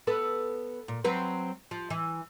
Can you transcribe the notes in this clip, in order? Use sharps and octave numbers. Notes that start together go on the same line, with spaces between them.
B3 A4 B4
A#2
F#3 C4 B4
F3
E3